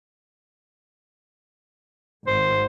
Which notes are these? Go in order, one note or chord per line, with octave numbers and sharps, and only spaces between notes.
G#1 C5